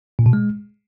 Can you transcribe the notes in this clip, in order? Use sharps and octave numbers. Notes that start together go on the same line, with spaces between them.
A#2
B2
G#3